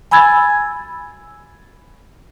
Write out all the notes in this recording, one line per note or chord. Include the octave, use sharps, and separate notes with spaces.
G#5 B5 E6 G#6 A6